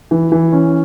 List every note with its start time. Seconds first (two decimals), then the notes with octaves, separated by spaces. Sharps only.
0.11 E3
0.32 E3
0.52 C#4